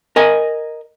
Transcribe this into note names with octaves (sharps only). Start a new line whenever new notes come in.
A#4 D#5 G#5